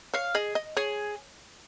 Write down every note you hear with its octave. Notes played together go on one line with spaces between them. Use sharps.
C#5 F5
G#4 D#5
D#5
G#4 C#5